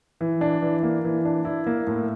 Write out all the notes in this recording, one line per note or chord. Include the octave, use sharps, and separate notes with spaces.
E3
D4
E3
A#3
E3
D4
E4
A#3
A2